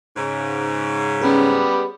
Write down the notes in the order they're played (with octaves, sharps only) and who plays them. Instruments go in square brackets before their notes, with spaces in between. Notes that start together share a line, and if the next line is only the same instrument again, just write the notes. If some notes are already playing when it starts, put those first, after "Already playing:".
[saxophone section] G#2 C#3
[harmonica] G3 B3 G4 [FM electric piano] C#4 G#4